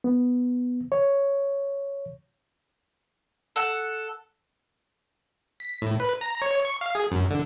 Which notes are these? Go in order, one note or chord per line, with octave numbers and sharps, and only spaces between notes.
B3
C#5
A4 F#5
B6
A2
B4
A#5
C#5
C#6
F5
G#4
F#2
D3